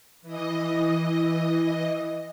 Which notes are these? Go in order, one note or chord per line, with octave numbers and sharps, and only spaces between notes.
E3 D#5